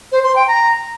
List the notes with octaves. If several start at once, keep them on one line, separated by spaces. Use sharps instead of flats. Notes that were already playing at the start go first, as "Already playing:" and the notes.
C5
C6
G5
A#5